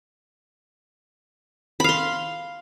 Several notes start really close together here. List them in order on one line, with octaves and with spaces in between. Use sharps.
B5 F5 C6